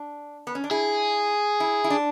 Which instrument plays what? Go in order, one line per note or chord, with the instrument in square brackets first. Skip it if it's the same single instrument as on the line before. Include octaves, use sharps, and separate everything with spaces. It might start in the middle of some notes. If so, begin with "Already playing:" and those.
Already playing: [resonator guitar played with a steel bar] D4
B3
C#4
D4
[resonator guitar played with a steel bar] E4 [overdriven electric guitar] G#4
[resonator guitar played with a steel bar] E4
E4
D4